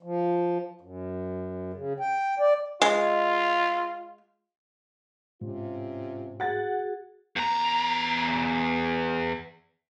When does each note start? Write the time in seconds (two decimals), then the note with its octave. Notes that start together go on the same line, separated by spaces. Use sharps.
0.03 F3
0.81 F#2
1.73 C#3
2.00 G5
2.39 D5
2.81 G#3 F4
5.41 G#2 C3 C#4 F4
6.40 F#4 G#4 F#5 A6
7.36 E2 A#5